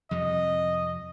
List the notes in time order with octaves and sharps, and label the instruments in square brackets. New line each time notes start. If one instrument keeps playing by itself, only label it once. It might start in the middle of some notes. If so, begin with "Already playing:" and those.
[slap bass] F2 C3 G3 [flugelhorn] D#5